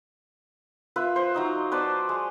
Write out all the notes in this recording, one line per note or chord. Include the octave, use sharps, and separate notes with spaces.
F4 B4 E5
C5
F#3 D#4 D#5
B4 C5 D5 A5
G#3